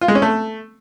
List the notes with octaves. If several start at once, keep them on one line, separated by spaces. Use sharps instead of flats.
F4
G#3
C#4
A3